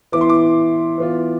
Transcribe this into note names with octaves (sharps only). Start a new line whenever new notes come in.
E3 B3 E4 D6
C6
D6
E3 B3 F4